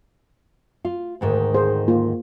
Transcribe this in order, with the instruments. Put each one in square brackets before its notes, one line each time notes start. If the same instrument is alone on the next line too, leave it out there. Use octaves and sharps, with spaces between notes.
[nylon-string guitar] F4
D2 G#2 D#3
[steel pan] G#4 C5
A#3 F4